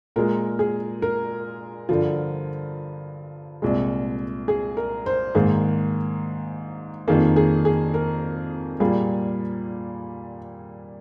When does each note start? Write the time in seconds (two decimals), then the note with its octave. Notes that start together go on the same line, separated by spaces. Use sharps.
0.16 A#2 G#3 A#4
0.59 G#4
1.02 A#4
1.89 G2 D3 F3
3.62 C2 A#2 G#3
4.48 G#4
4.77 A#4
5.06 C5
5.35 G#2 D#3 A#3 G#4
7.08 F2 D#3 A#3 G#4
7.36 G#4
7.65 G#4
7.94 A#4
8.80 A#2 G3 A#3 G#4